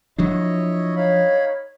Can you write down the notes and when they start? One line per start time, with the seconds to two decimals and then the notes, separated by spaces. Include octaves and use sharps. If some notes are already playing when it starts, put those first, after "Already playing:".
0.18 F3 F#3 D4 E4 C#5 D#5
0.96 D#4 C#5 F5 B5